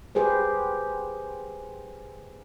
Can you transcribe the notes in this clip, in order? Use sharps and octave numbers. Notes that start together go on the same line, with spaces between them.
G4 G#4 B4 C5